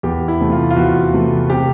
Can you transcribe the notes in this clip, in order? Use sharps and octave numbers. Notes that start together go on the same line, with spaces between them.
E2 G4
E4
C3 E3 A3
F4
F4
E2 F#4
C3 E3 A3
C3 G4